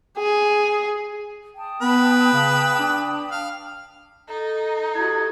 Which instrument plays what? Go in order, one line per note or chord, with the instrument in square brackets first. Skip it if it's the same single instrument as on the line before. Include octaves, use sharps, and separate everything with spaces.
[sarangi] G#4
[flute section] G5 A5 D#6
[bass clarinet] B3 [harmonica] B4
[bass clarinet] C#3
D4
[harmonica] F5
[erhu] D#4 [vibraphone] A4 D#5
[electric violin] E4 F#4 [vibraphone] G4 A4 D#6 [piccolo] G#6